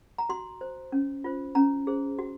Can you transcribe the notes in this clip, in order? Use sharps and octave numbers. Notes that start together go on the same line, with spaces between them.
A#5
F#4 C6
C5
C#4
F4 C5
C#4 A#5
G#4 C5
F#4